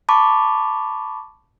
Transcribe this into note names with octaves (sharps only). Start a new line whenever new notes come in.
A5 B5 C#6 D6